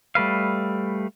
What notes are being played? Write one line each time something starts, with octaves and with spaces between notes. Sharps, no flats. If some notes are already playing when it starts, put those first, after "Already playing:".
G3 A3 B4 F5